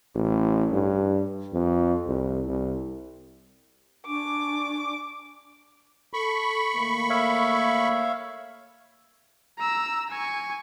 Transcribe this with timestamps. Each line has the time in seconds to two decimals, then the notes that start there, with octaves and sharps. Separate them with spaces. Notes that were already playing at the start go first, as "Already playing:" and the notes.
0.15 A1
0.72 G2
1.53 F2
2.07 C2
2.48 C2
4.06 D4 G#5 C#6 D6
6.13 A4 B5 C#6
6.75 D#3 A3 A#3
7.10 C#5 E5 F5
9.59 A#5 E6
10.10 G#5 C#6